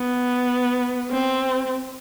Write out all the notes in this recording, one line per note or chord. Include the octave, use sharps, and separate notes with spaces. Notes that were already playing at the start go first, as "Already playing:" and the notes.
Already playing: B3
C4